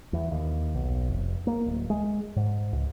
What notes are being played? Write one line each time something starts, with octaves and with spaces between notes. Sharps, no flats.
E2
D#2
B1
F1
A#3
D1
G#3
G#2
C#2